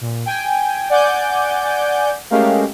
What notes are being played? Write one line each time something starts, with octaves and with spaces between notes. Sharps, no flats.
A#2
G5 G#5
D5 F#5 G#5 D6 G6
G#3 A3 C#4 G4 A#4 F5